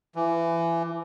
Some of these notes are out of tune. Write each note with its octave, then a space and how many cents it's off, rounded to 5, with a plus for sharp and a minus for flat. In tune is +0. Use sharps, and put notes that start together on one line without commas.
E3 +25